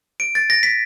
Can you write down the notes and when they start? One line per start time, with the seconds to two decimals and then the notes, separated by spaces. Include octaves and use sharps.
0.20 D7
0.35 A6
0.50 A#6
0.63 B6